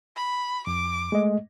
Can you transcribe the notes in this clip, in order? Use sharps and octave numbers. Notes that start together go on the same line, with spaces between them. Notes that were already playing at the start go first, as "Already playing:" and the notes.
B5
F2 D6
G#3 A3 D#5